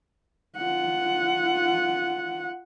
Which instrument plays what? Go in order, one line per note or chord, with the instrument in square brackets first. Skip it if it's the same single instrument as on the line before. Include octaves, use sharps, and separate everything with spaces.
[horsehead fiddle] F4 F#5